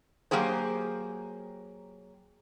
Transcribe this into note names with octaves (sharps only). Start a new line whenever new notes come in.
F#3 A#3 G4 G#4 C5